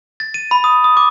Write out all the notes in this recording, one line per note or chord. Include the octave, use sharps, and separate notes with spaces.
A6
D#7
B5
D#6
D#6
D6